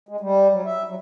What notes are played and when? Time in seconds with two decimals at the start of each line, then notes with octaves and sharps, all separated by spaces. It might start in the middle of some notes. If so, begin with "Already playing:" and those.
0.09 G#3
0.21 G3
0.51 F#3
0.65 E5
0.88 F#3